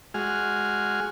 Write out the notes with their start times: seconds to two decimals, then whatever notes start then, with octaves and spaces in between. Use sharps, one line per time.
0.14 G#3 F#4 G#5 F6